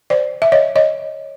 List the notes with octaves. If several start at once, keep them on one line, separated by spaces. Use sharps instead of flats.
C5 D5
E5
C#5 D#5
C#5 D#5